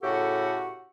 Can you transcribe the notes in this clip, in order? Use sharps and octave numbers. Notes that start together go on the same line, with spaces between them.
A2 C#3 F#4 G4 A4 F#5